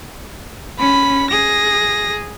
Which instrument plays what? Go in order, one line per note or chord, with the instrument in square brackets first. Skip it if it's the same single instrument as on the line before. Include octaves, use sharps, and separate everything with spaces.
[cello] C#4 [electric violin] B5
[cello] G#4 [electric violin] A#6